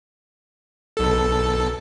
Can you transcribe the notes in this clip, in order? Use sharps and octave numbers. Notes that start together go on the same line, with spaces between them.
B1 A4